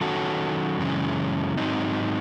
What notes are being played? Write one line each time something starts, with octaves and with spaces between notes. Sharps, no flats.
D#3 F#3 C#4 F#4 A4
F#2 C#3 E3 G#3 C#4
G#2 F#3 C4 D#4